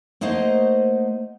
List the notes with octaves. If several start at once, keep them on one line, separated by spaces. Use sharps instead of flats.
A3 A#3 D#4 C5 D#5 F#5